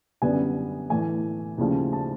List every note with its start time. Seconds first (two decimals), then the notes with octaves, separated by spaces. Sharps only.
0.22 F#2 D3 G3 B3 G#5
0.90 A2 E3 A3 G#5
1.58 D#2 C#3 F3 A3
1.93 A5